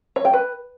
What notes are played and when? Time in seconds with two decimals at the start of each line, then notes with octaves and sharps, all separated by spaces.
0.16 C#5
0.25 G5
0.34 B4